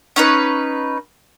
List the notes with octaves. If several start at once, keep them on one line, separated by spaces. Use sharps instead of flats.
C#4 D#4 B4